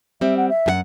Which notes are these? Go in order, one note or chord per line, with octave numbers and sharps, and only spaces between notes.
G3 C4 E5
F#5
E5
F#2 G#4 F#5